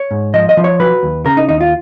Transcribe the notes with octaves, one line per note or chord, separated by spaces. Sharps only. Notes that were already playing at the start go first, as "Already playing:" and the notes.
Already playing: C#5
G#2
F3 D#5
D#5
F3
C#5
F#3 B4
D#2
C#3 A#4
D#4
D#2 D#4
F4